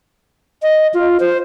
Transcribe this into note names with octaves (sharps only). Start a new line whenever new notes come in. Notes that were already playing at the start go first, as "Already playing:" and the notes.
D#5
F4
C5